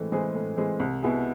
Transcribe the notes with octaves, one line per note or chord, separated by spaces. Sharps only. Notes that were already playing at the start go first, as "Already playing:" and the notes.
Already playing: A2 E3 G#3 C4
E3 G#3 C4 G#4
A2
E3 G#3 C4 G#4
C2
B2 B3 E4 G#4